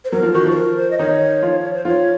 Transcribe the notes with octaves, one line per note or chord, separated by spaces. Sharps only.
C5
F#3 A#4
F3
D#3 F#4
F3
C5
A#4
C5
D#5
D#3 D#4 C#5
F3 F4
C5
F3 F4 C#5